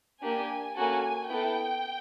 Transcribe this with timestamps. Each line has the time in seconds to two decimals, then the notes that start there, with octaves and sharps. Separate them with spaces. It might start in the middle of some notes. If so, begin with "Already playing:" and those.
0.22 A#3 D4 G4 G#5
0.75 A#3 C#4 F#4 A4 G#5
1.29 B3 E4 A4 G5